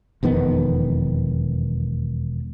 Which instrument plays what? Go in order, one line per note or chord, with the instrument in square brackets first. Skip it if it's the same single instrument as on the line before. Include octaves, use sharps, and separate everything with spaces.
[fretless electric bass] E1 F2 D#3 B3